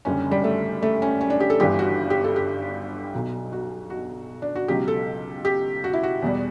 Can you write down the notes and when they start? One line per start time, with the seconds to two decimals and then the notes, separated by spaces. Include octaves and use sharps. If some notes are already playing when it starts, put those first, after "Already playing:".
0.05 F#1 F#2 D3 G3 C#4
0.31 G3
0.44 A3
0.83 A3
1.02 C#4
1.21 C#4
1.30 D4
1.40 G4
1.50 A4
1.60 G1 G2 E3 G3 G4
1.79 F#4
2.10 G4
2.24 A4
2.36 G4
3.14 B1 B2 F#3
3.52 F#4
3.90 F#4
4.42 D4
4.56 F#4
4.68 C#2 B2 F#3 G4
4.88 A4
5.45 G4
5.84 F#4
5.93 E4
6.03 F#4
6.22 E2 B2 G3